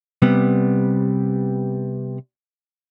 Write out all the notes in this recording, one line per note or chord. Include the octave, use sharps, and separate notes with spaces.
C3 G3 B3